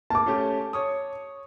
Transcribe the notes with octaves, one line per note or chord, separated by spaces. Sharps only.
A#3 A5 D6
A3 C#4 G4
C#5 C#6 D#6